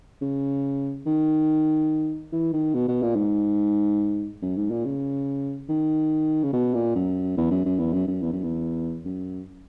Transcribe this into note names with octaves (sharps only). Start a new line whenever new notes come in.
C#3
D#3
E3
D#3
B2
B2
A#2
G#2
F#2
G#2
A#2
C#3
D#3
C#3
B2
A#2
F#2
E2
F#2
F#2
E2
F#2
F#2
E2
F#2
E2
F#2